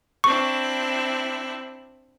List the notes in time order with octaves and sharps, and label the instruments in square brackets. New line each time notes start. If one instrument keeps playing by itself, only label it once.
[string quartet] C4 D4 E4 [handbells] C#6